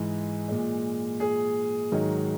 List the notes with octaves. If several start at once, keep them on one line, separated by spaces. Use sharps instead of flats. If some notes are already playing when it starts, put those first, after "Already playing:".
Already playing: G#2 E3 G#3
A#2 G#3
G#4
G#2 D#3 F#3